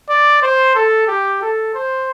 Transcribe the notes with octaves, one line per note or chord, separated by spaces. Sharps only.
D5
C5
A4
G4
A4
C5